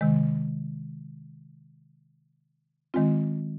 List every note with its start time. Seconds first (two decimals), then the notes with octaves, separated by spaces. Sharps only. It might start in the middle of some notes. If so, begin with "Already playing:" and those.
0.01 C3 D#3 G#3
2.94 D#3 G#3 C4 F4